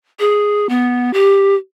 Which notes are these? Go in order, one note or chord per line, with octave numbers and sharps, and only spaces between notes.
G#4
B3
G4